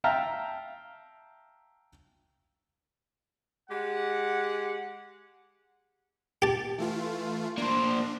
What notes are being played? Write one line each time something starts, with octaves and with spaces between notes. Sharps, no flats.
E5 F5 G5 A5 A#5 F6
G#3 G4 F#5
G4 A5
E3 A3 F4
A#3 D4 C5